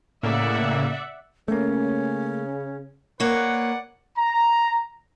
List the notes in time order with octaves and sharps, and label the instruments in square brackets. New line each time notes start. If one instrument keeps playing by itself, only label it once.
[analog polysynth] A2 C#3 A#3 [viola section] D5 E5 F#5
[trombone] C#3 [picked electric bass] A3 A#3 [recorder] C#4
[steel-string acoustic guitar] A#3 C#5 [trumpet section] B4 D5 F#5
[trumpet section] A#5